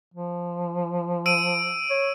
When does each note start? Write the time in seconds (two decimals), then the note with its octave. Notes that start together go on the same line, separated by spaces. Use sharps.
0.14 F3
1.26 E6 D7 D#7
1.90 C#5